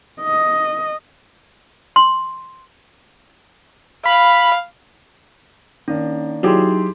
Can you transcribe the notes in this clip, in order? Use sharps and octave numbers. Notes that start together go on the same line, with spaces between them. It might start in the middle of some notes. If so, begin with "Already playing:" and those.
D#5
C6
F5 B5
D#3 A#3 C#4 D4
F#3 D#4 E4 G4 G#4 C6